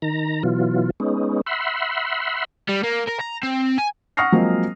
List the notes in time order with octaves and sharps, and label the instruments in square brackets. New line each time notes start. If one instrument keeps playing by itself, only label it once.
[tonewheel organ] D#3 A#5
B2 E3 F#3 F4
G#3 B3 C#4 D#4
E5 F#5 B5 C6
[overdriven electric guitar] G3
A#3
A#4
A#5
C4
G#5
[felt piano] F#5 C#6 D#6 F6 A#6 C7
F3 F#3 G#3 A#3 C4